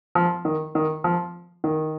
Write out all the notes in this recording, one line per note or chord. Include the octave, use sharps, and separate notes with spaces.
F3
D#3
D#3
F3
D#3